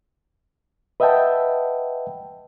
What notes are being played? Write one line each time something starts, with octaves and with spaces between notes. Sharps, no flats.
B4 D#5 E5 F#5 G5 A5